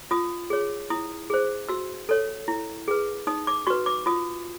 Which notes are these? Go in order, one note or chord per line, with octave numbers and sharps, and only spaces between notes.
F4 D#6
G#4 C#5
E4 D#6
G#4 C5
F#4 E6
A4 C#5
E4
G#4 B4
D#4 D#6
D6
F#4 B4 C#6
D6
F4 D#6